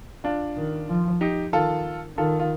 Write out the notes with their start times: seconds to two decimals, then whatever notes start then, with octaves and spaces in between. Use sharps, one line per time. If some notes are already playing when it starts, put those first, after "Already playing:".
0.24 D4 F4
0.57 D#3
0.89 F3
1.21 D#4 G4
1.53 D#3 F4 A4
2.17 D#3 F4 A4
2.40 F4